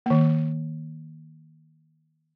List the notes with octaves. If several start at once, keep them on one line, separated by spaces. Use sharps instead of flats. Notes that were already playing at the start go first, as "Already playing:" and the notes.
D#3 A#3